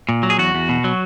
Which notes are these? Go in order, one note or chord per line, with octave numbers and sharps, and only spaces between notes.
A#2
F#3
G#4
E2 F#4
E2
B2
F#3